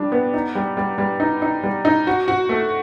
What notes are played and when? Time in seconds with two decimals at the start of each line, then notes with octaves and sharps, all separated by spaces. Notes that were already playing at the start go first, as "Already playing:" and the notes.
Already playing: G3 D4
0.12 B3
0.34 D#4
0.55 G3
0.77 G3
0.98 G3
1.20 D#4
1.42 D#4
1.63 G3
1.85 D#4
2.07 F#4
2.28 F#4
2.49 A3